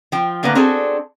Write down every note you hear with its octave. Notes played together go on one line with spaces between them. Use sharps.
F3 G5
A2 D3 A#3 B3 B4
C4 D4 F#4 G#4 A4